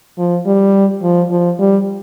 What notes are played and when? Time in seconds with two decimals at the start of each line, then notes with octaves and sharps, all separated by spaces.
0.18 F3
0.46 G3
1.03 F3
1.31 F3
1.59 G3